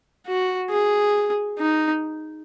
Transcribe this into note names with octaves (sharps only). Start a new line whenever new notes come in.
F#4
G#4
D#4